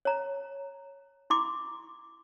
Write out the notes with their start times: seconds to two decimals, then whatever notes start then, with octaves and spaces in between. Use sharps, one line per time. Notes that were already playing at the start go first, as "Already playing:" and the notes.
0.05 C#5 A#5
1.30 E4 C6 D6